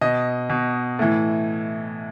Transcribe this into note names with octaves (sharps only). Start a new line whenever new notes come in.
B2 D#5
B2
A2 E3